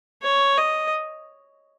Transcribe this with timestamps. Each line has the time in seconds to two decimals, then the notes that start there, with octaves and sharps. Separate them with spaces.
0.22 C#5
0.57 D#5